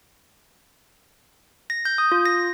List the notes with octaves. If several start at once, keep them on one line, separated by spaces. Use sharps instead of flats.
A#6
G6
D#6
F4
A#6